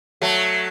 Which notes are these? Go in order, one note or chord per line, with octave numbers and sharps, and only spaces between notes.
F#3 A3